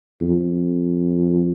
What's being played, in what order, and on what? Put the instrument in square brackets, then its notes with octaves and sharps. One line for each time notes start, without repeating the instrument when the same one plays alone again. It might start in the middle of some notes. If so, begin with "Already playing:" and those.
[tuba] F2